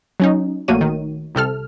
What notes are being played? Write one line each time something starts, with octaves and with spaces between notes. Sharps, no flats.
F#3 C#4 D#4
A#1 A3 A#3 F#4 C#5 D#7
D#3
C2 C3 A4 F6